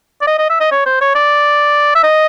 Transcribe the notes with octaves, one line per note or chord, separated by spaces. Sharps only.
D5
D#5
D#5
E5
D#5
C#5
C5
C#5
D5
E5
D#5